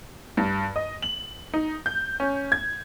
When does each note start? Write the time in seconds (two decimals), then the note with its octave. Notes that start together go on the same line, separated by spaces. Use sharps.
0.37 G2
0.76 D#5
1.02 F#7
1.54 D#4
1.86 G6
2.20 C#4
2.52 G#6